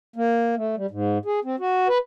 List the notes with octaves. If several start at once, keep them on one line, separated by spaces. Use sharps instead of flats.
A#3
A3
G3
G#2
G#4
C4
F#4
B4